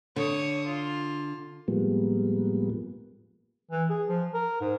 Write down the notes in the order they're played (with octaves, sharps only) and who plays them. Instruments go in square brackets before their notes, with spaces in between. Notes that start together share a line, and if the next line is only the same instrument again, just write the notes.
[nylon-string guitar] D3 [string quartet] C#5 D#6
[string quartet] F4
[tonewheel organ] A2 F3 G3 G#3 A#3 B3
[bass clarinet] E3
G#4
F3
A#4
G#2